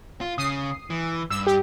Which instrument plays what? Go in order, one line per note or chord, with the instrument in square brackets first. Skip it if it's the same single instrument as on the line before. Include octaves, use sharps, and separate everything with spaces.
[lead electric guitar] F4
[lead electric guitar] C#3 [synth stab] D#6 C7
[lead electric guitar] E3
[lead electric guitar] G2 [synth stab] E6
[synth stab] G4